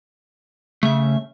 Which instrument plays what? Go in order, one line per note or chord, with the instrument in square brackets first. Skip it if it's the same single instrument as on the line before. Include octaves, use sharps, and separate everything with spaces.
[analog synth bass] C#3 [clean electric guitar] A3 E5